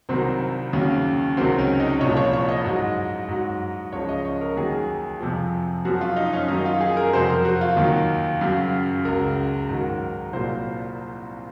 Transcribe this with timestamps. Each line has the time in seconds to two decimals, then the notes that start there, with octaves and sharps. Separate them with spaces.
0.09 C2 C3 D#3 F#3 C4
0.73 D#2 C#3 F#3 C#4
1.37 C#2 C3 D#3 F#3 C4
1.58 C#4
1.80 D#4
2.01 C2 A#2 F3 C#5
2.17 C#5
2.33 C#5
2.48 D#5
2.65 G#2 F#3
3.28 G#2 F#3
3.92 C#2 C#3 F3 C#5
4.09 D#5
4.25 C#5
4.41 A#4
4.57 D#2 D#3 F#3 G#4
5.20 F2 C3 F3
5.85 F#2 F3 F#4
6.01 F4
6.16 D#4
6.33 C#4
6.48 F#2 D#3 F#3 D#4
6.65 F4
6.81 G#4
6.97 A#4
7.13 F2 C3 F#3 C5
7.29 A#4
7.45 F#4
7.61 F4
7.77 D#2 D#3 F#3
8.41 F#2 C#3 F#3
9.05 C#2 C#3 F#3 A#4
9.69 G#2 D#3 F#3
10.33 C2 A#2 F#3 C5